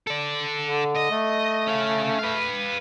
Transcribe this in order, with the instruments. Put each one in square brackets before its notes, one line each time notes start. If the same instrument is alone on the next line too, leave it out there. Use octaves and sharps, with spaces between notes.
[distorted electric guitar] A4 D5
[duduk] D3
[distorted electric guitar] D#5
[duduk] A3
[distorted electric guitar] C#4 F5
B4 F5